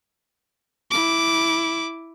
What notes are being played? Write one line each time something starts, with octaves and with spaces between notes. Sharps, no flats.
E4 D6